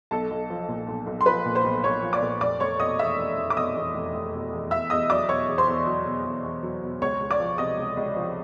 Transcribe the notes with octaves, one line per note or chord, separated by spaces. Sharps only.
B1 A4 A5
B1
F3
A#2
B1
B1
C6
F3 B4 B5
A#2
C5 C6
B1
B1 C#5 C#6
F3
D5 D6
A#2
F1 D5 D6
F1 C#5 C#6
B2 D#5 D#6
E2 E5 E6
F1
F1
D6
B2 D#5 D#6
E2
F1
F1
B2
E2
E2 E5 E6
E2 D#5 D#6
F#3 D5 D6
B2 C#5 C#6
E2
C5 C6
E2
F#3
B2
E2
E2
F#3
B2
C#2 C#5 C#6
C#2
D5 D6
F3
C3 D#5 D#6
C#2
C#2
F3